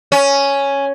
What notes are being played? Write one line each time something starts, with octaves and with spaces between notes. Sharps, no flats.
C#4